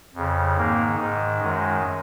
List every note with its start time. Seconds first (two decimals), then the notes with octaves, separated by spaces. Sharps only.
0.15 F2 C#3
0.57 G#2 D#3 A#3
0.99 G#2 D#3
1.41 F#2 D#3 G#3